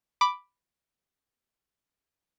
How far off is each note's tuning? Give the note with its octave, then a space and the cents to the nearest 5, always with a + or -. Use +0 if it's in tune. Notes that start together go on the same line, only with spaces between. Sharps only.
B5 +0 D6 +0